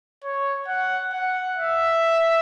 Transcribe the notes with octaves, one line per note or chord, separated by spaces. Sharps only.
C#5
F#5
F#5
E5